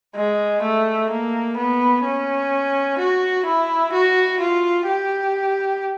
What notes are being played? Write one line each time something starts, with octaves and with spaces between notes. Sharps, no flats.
G#3
A3
A#3
B3
C#4
F#4
E4
F#4
F4
G4